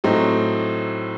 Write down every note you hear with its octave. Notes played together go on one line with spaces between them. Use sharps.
A2 F#3 A3 C4 D#4